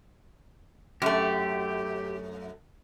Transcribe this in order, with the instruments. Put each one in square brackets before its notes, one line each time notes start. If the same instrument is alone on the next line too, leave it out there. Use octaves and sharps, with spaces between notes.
[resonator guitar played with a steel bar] F#2 A3 [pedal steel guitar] G4